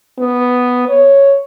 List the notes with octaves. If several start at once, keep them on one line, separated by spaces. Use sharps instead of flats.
B3
C#5